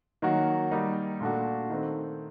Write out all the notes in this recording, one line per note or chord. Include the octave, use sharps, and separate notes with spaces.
D#3 F#3 A#3 F#4
D#3 G3 A#3 D#4
A#2 A3 D4 F#4
D#3 A3 C4